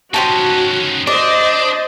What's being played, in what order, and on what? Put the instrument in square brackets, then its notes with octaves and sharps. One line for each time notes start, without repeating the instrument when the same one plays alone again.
[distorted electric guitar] C#4 D#4 [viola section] F#4 [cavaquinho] C5 G5 A5
[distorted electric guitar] D4 [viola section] C5 D#5 [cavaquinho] D5